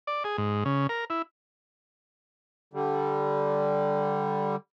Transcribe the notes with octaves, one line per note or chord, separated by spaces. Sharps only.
D5
G#4
G#2
C#3
A#4
E4
D3 G3